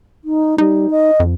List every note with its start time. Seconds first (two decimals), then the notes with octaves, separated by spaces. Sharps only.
0.24 D#4
0.58 G3 D#4
0.90 D#5
1.20 F2